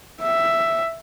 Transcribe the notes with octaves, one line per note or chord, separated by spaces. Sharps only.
E5